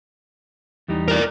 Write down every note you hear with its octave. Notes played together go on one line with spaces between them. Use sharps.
E2 G3 D#4
A#4 D5